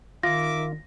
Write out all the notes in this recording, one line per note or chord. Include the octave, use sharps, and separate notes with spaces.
D#3 F4 A#4 E5 D6 A#6